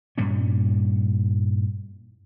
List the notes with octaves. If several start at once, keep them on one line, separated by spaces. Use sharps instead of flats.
G2 A#2 G3 C#4